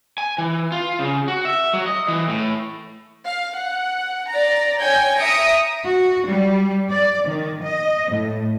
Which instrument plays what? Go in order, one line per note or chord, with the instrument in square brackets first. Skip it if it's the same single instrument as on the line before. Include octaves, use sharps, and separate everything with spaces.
[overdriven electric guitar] G#5
E3
F4
C#3
F#4
E5
F#3
D#5
E3
A2
[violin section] F5
F#5
D5 A#5
C#5 G5 G#5 G6 G#6
E5 A#5 D#6 C#7 D7
[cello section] F#4
G3
D5
D#3
D#5
A2